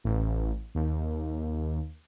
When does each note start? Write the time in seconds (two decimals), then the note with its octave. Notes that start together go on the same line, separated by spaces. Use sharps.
0.04 A1
0.75 D#2